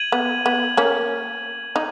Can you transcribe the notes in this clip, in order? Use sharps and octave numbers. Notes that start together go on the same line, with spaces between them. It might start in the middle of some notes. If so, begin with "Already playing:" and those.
Already playing: G#6 D#7 F#7
B3
B3
A#3 C#4
D#4